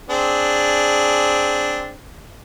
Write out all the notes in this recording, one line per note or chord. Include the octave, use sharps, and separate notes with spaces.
C4 D4 G#4